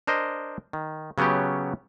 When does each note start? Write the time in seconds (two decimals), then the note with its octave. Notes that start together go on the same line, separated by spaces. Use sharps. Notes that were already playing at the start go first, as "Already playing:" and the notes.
0.07 D4 A#4 C5 D#5
0.73 D#3
1.18 C#3 F#3 B3 C#4 G4